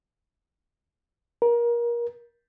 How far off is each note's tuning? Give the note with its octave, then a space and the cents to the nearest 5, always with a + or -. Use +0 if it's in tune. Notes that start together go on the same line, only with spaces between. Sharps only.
A#4 +25